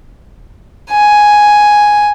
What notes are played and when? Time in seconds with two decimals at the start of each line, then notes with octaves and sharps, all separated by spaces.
0.91 G#5